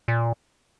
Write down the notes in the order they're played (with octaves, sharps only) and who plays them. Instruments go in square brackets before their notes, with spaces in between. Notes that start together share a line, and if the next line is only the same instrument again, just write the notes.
[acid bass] A#2